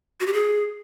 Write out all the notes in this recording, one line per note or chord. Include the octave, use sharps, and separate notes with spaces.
F#4
G4
G#4